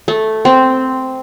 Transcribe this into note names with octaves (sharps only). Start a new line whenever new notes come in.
A3
C4